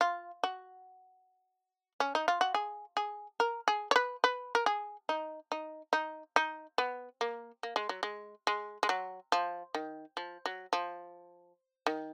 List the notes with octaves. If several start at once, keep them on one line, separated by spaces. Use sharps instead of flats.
F4
F#4
C#4
D#4
F4
F#4
G#4
G#4
A#4
G#4
C#5
B4
B4
A#4
G#4
D#4
D#4
D#4
D#4
B3
A#3
A#3
G#3
F#3
G#3
G#3
G#3
F#3
F3
D#3
F3
F#3
F3
D#3